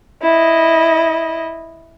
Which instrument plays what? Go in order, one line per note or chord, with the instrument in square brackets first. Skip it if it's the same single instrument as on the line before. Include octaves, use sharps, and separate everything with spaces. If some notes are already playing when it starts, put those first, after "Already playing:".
[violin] E4 D#5